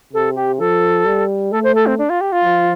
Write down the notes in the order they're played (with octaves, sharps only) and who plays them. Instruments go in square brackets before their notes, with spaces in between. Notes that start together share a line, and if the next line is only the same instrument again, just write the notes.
[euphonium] C3 [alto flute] A4
[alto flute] G4
[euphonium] F3 [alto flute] A4
[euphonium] G3
[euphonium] A3 [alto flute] A4
[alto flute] C5
A4
C4
D4
F4
G4
F4
[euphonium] F3